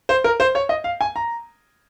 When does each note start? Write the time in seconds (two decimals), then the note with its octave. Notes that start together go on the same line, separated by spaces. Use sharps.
0.09 C5
0.24 A#4
0.40 C5
0.55 C#5
0.69 D#5
0.84 F5
1.01 G#5
1.16 A#5